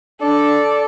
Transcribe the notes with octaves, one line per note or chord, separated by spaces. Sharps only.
D4 A4 D5